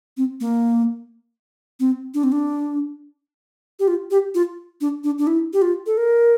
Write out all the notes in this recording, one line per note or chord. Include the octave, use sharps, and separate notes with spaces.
C4
A#3
C4
D4
C4
D4
G4
F4
G4
F4
D4
D4
D4
E4
G4
F4
A4
A#4